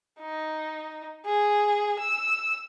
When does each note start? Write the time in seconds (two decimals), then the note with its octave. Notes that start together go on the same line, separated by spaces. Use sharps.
0.21 D#4
1.26 G#4
1.99 E6